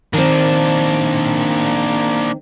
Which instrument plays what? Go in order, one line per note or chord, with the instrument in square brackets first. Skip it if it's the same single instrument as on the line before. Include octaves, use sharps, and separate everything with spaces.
[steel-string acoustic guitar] D#3 C4 [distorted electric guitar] A#3 D4